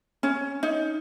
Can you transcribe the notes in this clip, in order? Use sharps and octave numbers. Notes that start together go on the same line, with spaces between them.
C#4
D#4